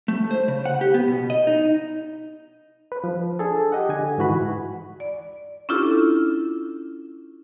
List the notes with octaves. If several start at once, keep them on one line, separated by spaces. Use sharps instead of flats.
A3
C5
C#3
F#5
G4
B3
B2
D#5
D#4
B4
F3
D4 G#4 A4
G4 D#5 F#5
D3 G#5
G#2 E3 F#4 B5
D5
C#4 D4 E4 F4 G4 A4